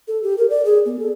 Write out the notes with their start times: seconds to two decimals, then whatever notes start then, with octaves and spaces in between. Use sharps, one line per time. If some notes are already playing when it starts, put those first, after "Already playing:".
0.08 A4
0.23 G4
0.38 A#4
0.50 D5
0.65 G#4
0.86 B3
0.99 A4